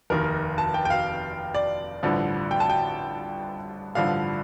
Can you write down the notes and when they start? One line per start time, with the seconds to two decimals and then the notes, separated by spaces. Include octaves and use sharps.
0.10 F1 D#2 D#3 A#4
0.58 A5
0.74 G5
0.85 G5
0.90 F5
1.54 D5
2.03 A1 G2 D3 F3
2.51 G5
2.60 A5
2.70 G5
3.95 A1 G2 D3 F3 F5